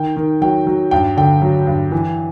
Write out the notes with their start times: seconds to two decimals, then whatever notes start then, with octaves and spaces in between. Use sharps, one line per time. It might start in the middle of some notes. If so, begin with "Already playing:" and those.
Already playing: D#3 G5
0.16 D#3
0.42 F#3 G5
0.67 F#3
0.91 G2 G5
1.17 D3 G5
1.42 F#3
1.67 G2
1.92 E3